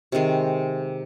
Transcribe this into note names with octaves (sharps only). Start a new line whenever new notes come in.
C3 D#3 G#3